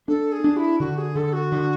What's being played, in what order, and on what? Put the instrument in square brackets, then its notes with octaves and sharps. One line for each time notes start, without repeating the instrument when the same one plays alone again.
[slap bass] D4 [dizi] A4
[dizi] G#4
[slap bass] D4
[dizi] E4
[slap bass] D3 [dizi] F#4
[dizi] G#4
[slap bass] D3 [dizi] A4
[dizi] F#4
[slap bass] D3